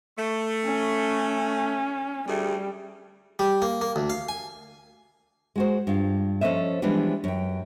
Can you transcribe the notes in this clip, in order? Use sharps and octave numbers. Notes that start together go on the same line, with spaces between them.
A3
C#4
D2 G3 A3 G#4
G3
A#3
A#3
D2
F5
G#5
G#3 F#4 C5
G2 F4
F3 C#4 A4 C5 D#5 E5
E3 F3 G3 G#3 B3 D4
F#2 G5